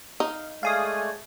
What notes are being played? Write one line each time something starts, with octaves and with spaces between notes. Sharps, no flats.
D#4 F5
G#3 A3 C#5 D5 F5 G#5 D#6